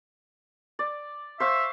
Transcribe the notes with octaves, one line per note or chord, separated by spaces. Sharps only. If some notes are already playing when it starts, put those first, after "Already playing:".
D5
C5 E5 F5 C#6